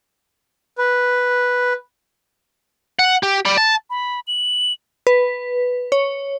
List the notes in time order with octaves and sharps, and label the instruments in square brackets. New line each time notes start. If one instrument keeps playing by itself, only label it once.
[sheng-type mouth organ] B4
[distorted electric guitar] F#5
G4
D5 B5
A5
[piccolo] B5
F#7
[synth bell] B4
C#5